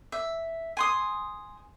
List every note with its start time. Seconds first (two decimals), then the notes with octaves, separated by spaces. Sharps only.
0.12 E5
0.77 G#5 C6 D#6